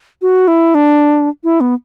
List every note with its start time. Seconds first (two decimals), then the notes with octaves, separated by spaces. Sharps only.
0.22 F#4
0.48 E4
0.74 D4
1.44 E4
1.60 B3